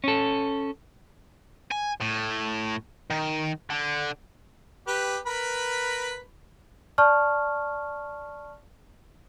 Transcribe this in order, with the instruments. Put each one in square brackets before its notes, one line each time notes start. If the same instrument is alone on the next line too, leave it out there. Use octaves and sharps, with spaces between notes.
[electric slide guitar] C#4 A4
[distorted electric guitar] G#5
A2
D#3
D3
[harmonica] G4 B4
A#4 B4 B5
[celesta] D5 A5 C#6 F6